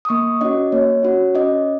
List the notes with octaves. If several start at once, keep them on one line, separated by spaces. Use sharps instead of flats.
D#6
A#3 C#6
C#4 F#4 D#5
A#3 C#5
C#4 F#4
C#4 D#5